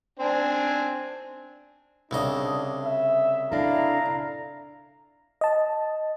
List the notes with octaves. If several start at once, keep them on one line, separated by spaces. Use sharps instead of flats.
C4 D4 G#5
C2 C#3 D4 D#5
E5
D4 E4 A4 F5 A#5
D#5 A5